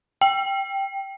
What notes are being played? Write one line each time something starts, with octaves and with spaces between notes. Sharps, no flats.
G5